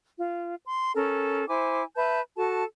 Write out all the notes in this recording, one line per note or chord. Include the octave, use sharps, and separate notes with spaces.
F4
C6
C#4 A4 A#4
E4 C5 G#5 D6
B4 E5 A5 G6
F#4 A4 A5